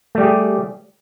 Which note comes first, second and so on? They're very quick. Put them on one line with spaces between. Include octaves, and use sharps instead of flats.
A3 G3 G4 G#4